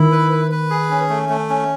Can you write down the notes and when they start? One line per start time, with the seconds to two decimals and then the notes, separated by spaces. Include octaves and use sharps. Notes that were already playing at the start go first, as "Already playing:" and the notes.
Already playing: D#3 E4
0.12 B4
0.32 B4
0.51 B4
0.70 G#4
0.90 C#4
1.10 A3
1.29 A3
1.50 C#4